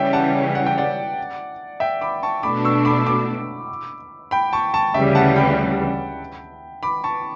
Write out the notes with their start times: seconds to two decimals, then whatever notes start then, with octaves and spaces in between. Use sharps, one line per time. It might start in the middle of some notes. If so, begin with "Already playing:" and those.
Already playing: C#3 E3 G3 C#4 E5 G5
0.13 F#5 A5
0.55 F#5
0.66 G5
0.78 D5 F#5
1.80 E5 G5
2.01 B5 D6
2.23 A5 C#6
2.43 B2 A3 D4 B5 D6
2.65 C#6 E6
2.85 B5 D6
3.07 B5 D6
4.31 G5 B5
4.53 A5 C#6
4.74 A5 C#6
4.94 D2 C#3 E3 G3 E5 G5
5.15 F#5 A5
5.36 G5 B5
6.83 B5 D6
7.04 A5 C#6